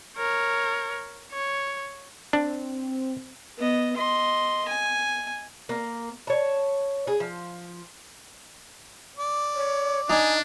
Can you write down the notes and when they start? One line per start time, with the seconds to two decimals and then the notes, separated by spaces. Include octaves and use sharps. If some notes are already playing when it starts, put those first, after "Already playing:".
0.17 A#4 C#5
1.32 C#5
2.33 C4 D4
3.57 B3 D#5
3.96 D#5 C6
4.68 G#5
5.69 A#3
6.27 C#5 A5
7.07 G#4
7.20 F3
9.17 D5
9.55 C#5
10.10 D4 D#4 G#5